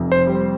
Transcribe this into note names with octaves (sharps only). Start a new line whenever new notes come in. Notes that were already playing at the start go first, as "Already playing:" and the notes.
Already playing: F1 F2
C5
G3